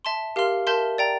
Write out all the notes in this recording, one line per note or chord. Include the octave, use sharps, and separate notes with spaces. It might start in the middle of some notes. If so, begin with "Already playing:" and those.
E5 A5 C6
G4 A#4 F5 C6 F6
A#4 E5 A5 C6 G6
D5 G5 A#5